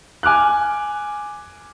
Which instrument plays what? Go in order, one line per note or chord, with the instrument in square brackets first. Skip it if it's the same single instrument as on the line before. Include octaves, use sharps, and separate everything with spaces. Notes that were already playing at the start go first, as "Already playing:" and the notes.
[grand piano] G#5 D6 F6 F#6